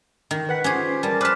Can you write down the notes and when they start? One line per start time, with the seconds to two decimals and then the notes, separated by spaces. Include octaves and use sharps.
0.31 D#3
0.49 B4 F#5 B6
0.64 C#4 F4 G4 G#4 C5
1.03 G3 A#4 A5
1.21 B4 C5 A5 D6 F6 B6